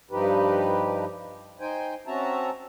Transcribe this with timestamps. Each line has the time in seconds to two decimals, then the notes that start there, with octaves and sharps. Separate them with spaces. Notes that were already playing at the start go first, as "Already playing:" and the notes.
0.11 G2 F3 D#4 G4 B4
1.60 D#4 C5 G5 G#5
2.07 C4 C#4 F#4 E5 A5 A#5